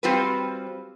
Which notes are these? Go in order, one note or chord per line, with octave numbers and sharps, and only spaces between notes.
G3 C4 F4 F#4 B4